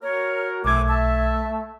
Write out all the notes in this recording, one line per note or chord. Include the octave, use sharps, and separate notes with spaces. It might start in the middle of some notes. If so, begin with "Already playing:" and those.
F#4 A#4 C#5
B1 C3 E3 A3 D6 G#6
E5 A5